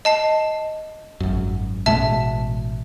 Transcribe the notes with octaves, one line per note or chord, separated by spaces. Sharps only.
D#5 A5 C7
G#1 F#2
A1 B2 G#3 E5 A5